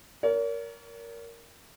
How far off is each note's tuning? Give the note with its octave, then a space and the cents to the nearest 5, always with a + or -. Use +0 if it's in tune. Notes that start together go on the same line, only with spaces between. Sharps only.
A#4 +0 C#5 +45